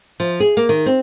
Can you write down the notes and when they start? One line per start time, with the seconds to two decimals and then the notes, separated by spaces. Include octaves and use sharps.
0.20 F3
0.40 G#4
0.57 A#3
0.69 D#3
0.86 C4